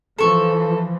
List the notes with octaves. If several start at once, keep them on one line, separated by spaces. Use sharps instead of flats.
E3 F3 A4 C#6